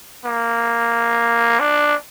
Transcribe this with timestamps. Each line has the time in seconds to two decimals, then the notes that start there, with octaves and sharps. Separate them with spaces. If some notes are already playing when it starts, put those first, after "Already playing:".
0.25 A#3
1.60 D4